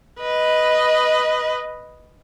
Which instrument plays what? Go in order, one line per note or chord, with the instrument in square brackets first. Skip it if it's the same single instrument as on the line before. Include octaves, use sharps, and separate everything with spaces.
[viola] B4 D#5